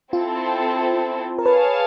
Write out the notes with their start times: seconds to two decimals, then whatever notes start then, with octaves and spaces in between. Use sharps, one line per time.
0.12 C4 E4 F4 A4 C5
1.39 A#4
1.46 G#4 B4 C#5 F5 A5